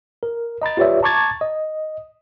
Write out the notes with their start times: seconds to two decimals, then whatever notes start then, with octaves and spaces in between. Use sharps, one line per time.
0.23 A#4
0.62 D#5 A#5 B5 A6
0.77 F4 G4 B4 C#5 D5 E5
1.03 A5 A#5 C#6 D6 G#6 A6
1.41 D#5